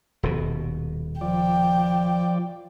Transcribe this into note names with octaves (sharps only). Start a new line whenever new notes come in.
D#1 B2
F3 D5 G5